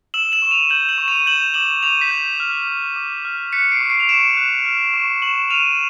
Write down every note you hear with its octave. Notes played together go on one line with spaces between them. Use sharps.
E6 E7 F#7
E7 F#7
C#6
D#7 F7
G6 E7 F#7
E7 F#7
C#6
D#7 F7
G6 E7 F#7
D6 E7 F#7
D6 D#7 F7
B6
G6
F6
D6
D6
F6
F#6 B6 C#7
C7 D7
C#6
C7 D7
F7
C#6 D7 E7
F#6
F6
C#6
C#6 E7 F#7
F6 D#7 F7